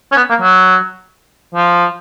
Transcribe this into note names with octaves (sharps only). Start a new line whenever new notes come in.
C#4
B3
A#3
F#3
F3